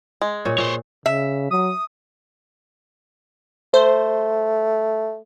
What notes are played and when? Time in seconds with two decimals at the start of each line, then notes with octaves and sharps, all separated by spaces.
0.22 G#3
0.45 A#2 C#5
0.58 A#2 C5 C#5
1.06 C#3 E5
1.51 F#3 D#6
3.74 A3 C5